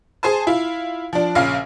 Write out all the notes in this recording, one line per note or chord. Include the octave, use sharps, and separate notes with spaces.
G#4 C5 G#5 A5
E4 F4
F3 D4
A#1 C#3 F5